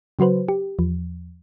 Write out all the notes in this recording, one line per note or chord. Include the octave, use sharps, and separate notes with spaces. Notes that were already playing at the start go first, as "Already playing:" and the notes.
C#3 F#3 F#4 B4 C5
G4
E2 F3